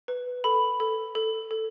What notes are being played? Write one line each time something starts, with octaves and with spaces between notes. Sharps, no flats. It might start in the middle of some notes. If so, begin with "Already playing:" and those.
B4
A4 B5
A4
A4
A4